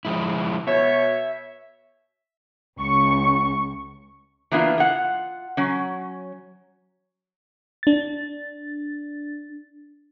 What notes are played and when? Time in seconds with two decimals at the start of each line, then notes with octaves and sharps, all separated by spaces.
0.05 F3 G#3 E4
0.67 B2 C#5 E5
2.78 C#2 C#6
4.51 E3 A#3 B3 D4 E4 F4
4.78 F4 F#5
5.57 F#3 C#4
7.83 D4 A6